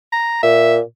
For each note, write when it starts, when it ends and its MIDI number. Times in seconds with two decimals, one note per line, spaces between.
0.13 0.42 82
0.43 0.80 46
0.43 0.76 76